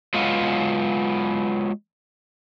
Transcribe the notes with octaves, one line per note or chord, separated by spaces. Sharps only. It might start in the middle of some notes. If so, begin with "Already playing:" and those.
F#3 G#3 B3 F4